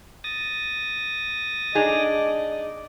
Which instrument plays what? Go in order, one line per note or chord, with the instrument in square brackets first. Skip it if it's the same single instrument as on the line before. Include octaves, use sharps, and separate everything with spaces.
[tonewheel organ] D#6 A6 A#6
[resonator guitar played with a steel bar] D4 D#4 G#4 [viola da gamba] D5 D#5